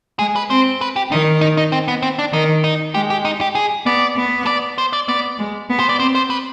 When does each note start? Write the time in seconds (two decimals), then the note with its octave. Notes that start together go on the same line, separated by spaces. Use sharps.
0.19 G#3 G#4
0.36 B4
0.50 C4 C5
0.81 B4
0.96 G4
1.11 D#3 D#4
1.41 D#4
1.57 D#4
1.72 C4
1.88 B3
2.02 C4
2.19 D4
2.33 D#3 D#4
2.64 D#4
2.95 G#3 G4
3.10 G4
3.25 D#4
3.41 G4
3.55 G#4
3.86 B3 D5
4.17 B3
4.47 D5
4.78 C5
4.93 D5
5.08 B3 D5
5.38 G#3
5.70 B3
5.79 C5
5.89 D5
6.00 C4 C5
6.15 C5
6.30 B4